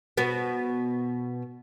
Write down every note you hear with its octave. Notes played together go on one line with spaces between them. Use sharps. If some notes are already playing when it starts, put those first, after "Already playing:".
B2 B3